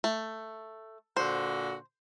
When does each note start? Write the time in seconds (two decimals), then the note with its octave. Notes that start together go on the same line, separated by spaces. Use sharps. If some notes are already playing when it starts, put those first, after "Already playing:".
0.04 A3
1.17 A#2 D3 F#4 C5